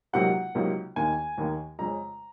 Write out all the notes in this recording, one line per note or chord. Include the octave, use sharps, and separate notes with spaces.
C#2 C3 F#3 A#3 D#4 F#5
C#2 C3 F#3 A#3 D#4
D#2 D#3 A#3 G#5
D#2 D#3 A#3
F2 C#3 G#3 C#4 A#5